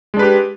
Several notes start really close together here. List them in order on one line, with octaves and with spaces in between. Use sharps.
G#3 D4 B4 G4